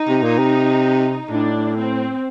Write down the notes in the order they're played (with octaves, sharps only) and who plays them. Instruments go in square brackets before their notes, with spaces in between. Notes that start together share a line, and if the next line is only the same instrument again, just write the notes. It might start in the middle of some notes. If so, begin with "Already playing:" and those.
Already playing: [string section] D#4
[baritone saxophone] C3
A#2
C3
[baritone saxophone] A2 [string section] D4
[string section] C4